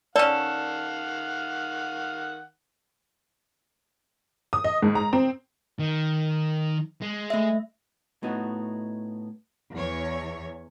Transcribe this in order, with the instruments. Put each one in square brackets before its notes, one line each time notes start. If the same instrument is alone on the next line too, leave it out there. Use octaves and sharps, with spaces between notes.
[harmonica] D#3 F5 F#5 [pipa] C#4 A4 [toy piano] D5
[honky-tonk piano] D#6
D#5
G#2
A#5
C4
[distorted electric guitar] D#3
G#3
[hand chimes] A3 E5
[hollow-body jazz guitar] A2 B3 D#4 F#4
[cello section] E2 C#5